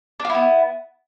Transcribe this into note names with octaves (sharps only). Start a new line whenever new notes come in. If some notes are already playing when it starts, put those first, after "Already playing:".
B3 D4 E4 F4